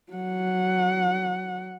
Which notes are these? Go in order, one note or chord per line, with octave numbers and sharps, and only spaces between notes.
F#3 F#5